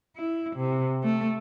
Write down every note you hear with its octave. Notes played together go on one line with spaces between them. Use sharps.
E4
C3
A3